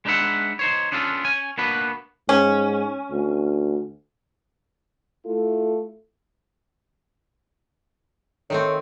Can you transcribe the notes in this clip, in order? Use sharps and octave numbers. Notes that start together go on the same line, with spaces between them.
G#3 D4 D#4 B4 E5 F#5
D#4 C5 C#5
B3 C#4 D4 F4 A4
C#4 G#5
A#3 B3 D4 F#4 B4
G#2 C#4
D2
A3 E4 F4 A4
D#3 A3 C4 C#5